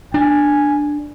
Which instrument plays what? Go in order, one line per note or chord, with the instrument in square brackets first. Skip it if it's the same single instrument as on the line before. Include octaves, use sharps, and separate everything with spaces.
[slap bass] D4 [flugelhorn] G#5